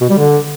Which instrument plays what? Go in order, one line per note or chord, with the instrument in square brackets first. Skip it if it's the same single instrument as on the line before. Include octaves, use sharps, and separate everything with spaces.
[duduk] B2
G3
D3